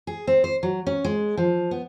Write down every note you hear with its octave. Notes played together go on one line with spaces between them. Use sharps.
G#4
C4
C5
F#3
C#4
G#3
F3
B3